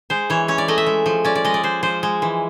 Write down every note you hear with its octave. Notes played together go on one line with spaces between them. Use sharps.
G#3 C5
E3 C#5
C#4 C#5
D5
A3 D#5
E5
G#3
F3
C#4 D5
D5
G#3 D#5
D5
G#3 C5
F3 C5
G#3
E3